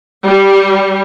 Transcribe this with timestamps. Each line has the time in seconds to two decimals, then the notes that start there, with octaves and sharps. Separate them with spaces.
0.24 G3